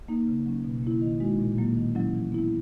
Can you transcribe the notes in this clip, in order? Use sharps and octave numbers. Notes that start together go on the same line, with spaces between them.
A#3 D#4
C#3
F#3 C#4
B2
A#3 E4
D#3
G#3 D#4 F#4
A#2
F#3 A#3
D#3
F#3 C#4 E4
E3
B3 E4